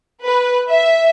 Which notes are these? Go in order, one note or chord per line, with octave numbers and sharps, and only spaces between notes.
B4
E5